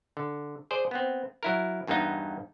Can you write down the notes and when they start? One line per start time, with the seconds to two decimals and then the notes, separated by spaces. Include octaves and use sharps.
0.17 D3
0.71 G#4 C5 D5
0.91 B3 C4
1.43 F#3 E4 A#4
1.87 E2 G2 A#3 B3 D#4